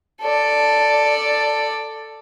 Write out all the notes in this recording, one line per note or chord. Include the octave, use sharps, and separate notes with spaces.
A4 D5